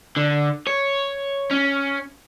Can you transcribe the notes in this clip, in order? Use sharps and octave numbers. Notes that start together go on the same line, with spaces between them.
D3
C#5
C#4